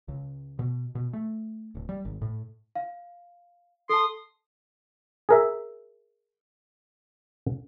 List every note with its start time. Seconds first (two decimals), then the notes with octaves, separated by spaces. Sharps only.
0.08 C#2
0.59 B2
0.95 B2
1.13 A3
1.75 D1
1.89 G3
2.05 G#1
2.22 A2
2.75 F5
3.89 A4 A5 C6 D#6
5.29 G#4 A#4 E5